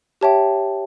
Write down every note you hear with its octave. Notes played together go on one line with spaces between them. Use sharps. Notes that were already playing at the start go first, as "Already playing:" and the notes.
G4 C#5 E5 G5 A5